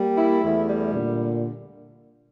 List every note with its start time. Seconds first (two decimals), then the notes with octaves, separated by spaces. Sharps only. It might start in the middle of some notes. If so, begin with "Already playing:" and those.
Already playing: G3 A#3
0.17 E4
0.42 E2 A3
0.68 G3
0.93 A#2 D3